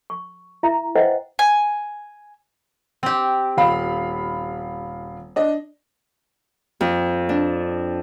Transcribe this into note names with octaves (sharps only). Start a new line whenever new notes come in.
C#6
E4 E5 A#5
B4 C5 D#5 E5 F#5 G5
G#5
C4 G4
D#1 F5 B5
D4 D#5
F2
D4